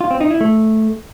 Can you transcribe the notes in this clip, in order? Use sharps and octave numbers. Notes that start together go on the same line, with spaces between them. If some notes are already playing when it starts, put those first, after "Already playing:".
F4
C4
D#4
E4
A3